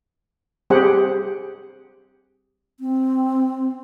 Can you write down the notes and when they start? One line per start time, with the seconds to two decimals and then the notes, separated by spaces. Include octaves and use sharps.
0.70 G3 C4 G4 G#4 C5 F#5
2.80 C4